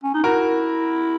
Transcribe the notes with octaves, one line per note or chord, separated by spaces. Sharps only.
C#4
D#4
E4 F#4 A#4